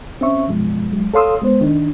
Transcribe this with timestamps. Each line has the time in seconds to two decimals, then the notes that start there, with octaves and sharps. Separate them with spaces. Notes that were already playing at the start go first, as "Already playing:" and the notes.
0.21 C4 C#4 E5 C#6
0.48 F#2 B2 F3 G#3
0.92 F#3 G#3
1.14 A4 C#5 F5 C6 D#6 E6
1.42 G#3 B3 C5
1.61 D#3 D4 D#4